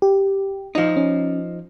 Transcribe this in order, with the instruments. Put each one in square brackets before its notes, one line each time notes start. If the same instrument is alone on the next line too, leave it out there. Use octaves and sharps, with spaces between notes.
[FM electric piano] G4
[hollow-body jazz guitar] F3 D#4
[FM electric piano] C#4